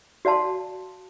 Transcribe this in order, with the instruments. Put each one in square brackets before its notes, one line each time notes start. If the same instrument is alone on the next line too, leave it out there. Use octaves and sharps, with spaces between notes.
[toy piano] F#4 D5 F5 A5 C6